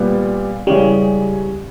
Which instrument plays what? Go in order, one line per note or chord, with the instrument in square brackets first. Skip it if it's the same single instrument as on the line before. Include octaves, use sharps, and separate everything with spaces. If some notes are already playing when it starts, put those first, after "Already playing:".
Already playing: [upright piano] A#2 G3 B3
[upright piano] C#3 E3 G#3 C#4 [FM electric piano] G3